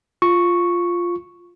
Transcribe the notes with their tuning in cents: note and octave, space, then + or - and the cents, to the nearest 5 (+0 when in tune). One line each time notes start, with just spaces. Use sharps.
F4 +0 C#6 +0